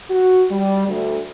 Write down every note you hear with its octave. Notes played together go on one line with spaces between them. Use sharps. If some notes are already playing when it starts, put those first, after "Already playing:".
F#4
G3
D2